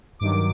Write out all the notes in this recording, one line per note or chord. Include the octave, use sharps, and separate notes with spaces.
G2 D#3 F#3 D6